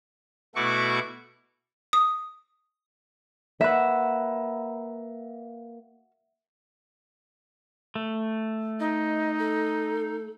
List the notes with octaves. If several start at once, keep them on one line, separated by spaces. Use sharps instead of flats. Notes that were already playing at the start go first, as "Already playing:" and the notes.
B2 A3 E4 F#4 C#6 D6
D#6
A#3 F#4 B4 E5 F#5
A3
D#4 D#5
A4